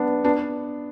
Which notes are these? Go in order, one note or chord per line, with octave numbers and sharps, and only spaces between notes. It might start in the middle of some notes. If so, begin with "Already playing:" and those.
Already playing: B3 D4
B3 D4